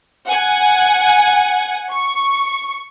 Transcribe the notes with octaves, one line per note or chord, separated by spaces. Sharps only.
F#5 G#5
C#6